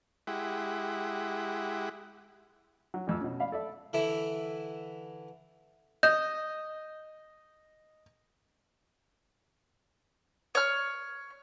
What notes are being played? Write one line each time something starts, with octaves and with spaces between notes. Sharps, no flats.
G#3 E4 G4 F#5
F#3
A1 F2 E6
B2 C#4
D5 F5 B5
A4 D5 E5
D3 E3 E4
D#5 G6
C#5 F6